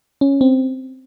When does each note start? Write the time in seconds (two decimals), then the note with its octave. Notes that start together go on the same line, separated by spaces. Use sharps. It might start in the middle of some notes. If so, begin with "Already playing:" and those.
0.21 C#4
0.41 C4